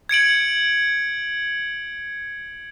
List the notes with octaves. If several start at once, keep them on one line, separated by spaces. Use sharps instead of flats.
G#6 C#7 D7 F#7